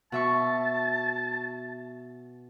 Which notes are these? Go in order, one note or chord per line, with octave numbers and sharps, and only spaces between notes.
B2 E5 A5 C#6